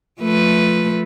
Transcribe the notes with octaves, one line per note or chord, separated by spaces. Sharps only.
F3 A3 B4